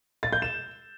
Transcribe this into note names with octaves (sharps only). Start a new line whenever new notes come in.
A6
G6
E7